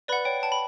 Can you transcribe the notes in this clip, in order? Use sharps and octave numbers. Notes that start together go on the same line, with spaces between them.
B4 D5 F#5 B5
C#5 G5
G5 A5
B5